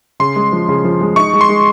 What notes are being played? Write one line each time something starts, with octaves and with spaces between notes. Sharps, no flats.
C#3 C6
G#3
F3
C#3
F3
G#3
D#4 C#6
G#3
C6
G#3